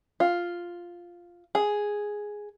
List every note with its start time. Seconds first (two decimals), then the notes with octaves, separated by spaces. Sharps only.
0.20 F4
1.55 G#4